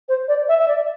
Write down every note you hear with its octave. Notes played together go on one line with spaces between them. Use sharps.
C5
D5
E5
E5
D5